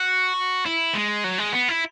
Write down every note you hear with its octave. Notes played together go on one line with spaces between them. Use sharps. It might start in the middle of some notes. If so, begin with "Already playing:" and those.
Already playing: F#4
E4
G#3
F#3
G#3
B3
E4